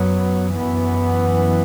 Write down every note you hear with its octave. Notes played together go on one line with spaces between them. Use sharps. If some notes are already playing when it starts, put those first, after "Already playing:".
Already playing: F#2 F#3 B3
F#2 E3 B3